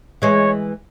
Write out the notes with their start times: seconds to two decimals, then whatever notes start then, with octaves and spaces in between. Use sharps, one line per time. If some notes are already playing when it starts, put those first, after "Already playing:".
0.22 E3 G#3 C#5